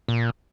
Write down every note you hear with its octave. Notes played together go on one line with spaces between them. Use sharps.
A#2